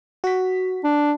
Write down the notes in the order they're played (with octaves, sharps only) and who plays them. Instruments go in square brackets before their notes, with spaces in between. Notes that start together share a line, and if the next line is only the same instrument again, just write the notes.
[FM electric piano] F#4 B6
[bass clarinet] D4